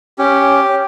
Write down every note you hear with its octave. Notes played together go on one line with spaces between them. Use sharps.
C#4 G4